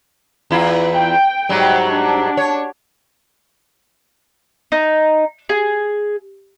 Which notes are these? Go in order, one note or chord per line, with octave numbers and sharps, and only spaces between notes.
E2 E4 F4
G5
G#2 F#3 G3
D4
C#5
D#4
G#4